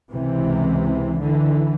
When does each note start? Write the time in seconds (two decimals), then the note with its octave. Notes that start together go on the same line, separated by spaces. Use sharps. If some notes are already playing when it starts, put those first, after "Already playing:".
0.11 C#2 C3 E3
1.18 D3 E3